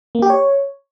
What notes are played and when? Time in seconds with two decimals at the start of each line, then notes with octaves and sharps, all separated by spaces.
0.15 A#3
0.22 G4
0.30 C#5